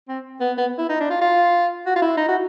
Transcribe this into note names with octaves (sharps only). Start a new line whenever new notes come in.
C4
B3
B3
E4
D#4
D4
F4
F4
F#4
F4
E4
D#4
F#4